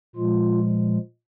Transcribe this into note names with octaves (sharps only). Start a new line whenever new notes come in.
A#2 F3 G#3 F4